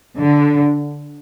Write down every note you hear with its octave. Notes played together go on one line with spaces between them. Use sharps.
D3